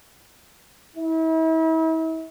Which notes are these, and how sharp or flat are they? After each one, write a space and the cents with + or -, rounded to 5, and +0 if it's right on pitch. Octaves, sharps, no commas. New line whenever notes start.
E4 -40